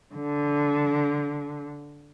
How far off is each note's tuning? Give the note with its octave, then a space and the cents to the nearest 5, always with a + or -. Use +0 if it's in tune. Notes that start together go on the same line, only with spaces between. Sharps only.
D3 -15